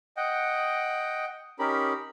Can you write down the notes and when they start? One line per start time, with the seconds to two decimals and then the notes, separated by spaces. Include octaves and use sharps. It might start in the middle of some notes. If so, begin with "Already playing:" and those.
0.17 D#5 F#5 G5
1.59 C#4 D#4 G4 A#4 B5